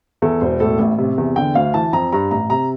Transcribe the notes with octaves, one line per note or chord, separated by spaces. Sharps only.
E2 A4
E1 C5
A2 A4
A1
C3
E2
D3 G5
D2 F5
E3 A5
F2 A#5
G2 A#5
A1 A#5
C3 A#5